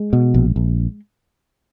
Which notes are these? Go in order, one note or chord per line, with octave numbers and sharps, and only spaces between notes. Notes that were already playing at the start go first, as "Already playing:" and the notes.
Already playing: G#3
B2
A#1
A#1